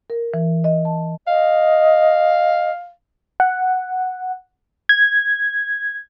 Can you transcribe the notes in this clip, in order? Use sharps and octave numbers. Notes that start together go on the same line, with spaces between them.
A#4
E3
D#5
A5
D#5 F5
F#5
G#6